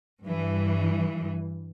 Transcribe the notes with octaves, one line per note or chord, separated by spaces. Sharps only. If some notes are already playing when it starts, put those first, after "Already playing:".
G2 E3